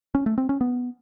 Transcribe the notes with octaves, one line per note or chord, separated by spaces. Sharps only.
C#4
A3
C4
C#4
B3